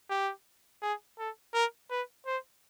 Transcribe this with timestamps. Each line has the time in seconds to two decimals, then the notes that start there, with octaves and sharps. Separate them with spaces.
0.10 G4
0.82 G#4
1.19 A4
1.54 A#4
1.91 B4
2.26 C5